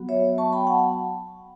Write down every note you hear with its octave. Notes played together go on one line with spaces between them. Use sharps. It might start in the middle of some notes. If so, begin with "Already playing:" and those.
Already playing: F#3 B3 F#4
C#5 E5
A5 C#6
G5 B5
F#5 A5